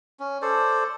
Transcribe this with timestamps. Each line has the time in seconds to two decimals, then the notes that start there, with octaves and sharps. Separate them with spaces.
0.20 C#4
0.42 A4 C5 D5